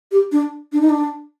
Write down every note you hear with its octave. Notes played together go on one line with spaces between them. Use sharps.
G4
D4
D4
D#4
D4